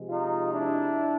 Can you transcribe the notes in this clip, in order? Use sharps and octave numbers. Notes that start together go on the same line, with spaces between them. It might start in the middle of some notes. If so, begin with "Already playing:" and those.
Already playing: C3 F3 G#3
D#4 F4
D4 E4